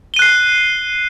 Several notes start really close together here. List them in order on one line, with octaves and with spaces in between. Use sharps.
G7 D#7 F#6 C7